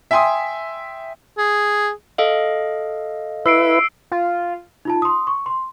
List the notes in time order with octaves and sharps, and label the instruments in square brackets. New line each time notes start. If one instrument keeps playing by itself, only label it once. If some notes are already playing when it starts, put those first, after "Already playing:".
[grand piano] E5 G5 G#5 C6 D#6
[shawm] G#4
[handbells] A4 D#5 F5
[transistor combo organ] E4 B4 [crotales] E6 C7 D7
[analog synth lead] F4
[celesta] D#4 F4 A5
C6 D#6
C#6
C6